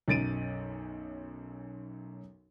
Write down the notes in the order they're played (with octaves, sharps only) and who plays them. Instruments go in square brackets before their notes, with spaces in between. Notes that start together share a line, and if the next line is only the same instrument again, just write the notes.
[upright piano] B1 F#2 A6 D7 D#7